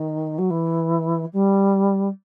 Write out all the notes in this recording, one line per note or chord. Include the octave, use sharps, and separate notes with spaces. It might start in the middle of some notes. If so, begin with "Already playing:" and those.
Already playing: D#3
F#3
E3
G3